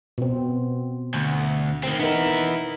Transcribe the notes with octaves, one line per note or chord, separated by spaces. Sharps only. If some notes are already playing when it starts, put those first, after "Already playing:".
B2 C4
D2
D#3 C4
B3 D#4 E4 A#4